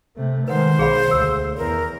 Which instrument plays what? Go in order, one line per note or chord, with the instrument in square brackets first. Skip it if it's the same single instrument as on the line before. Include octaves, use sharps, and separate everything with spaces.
[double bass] C3 A3
[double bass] D#3 G#3 [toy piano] B4 F#5 [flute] C5
[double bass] B1 [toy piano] G#4 F5 B5
[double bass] D2 [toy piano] E6
[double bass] E2 [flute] A#4